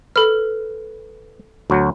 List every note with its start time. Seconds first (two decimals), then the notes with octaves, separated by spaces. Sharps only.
0.16 A4 B4 F6
1.70 D2 F#3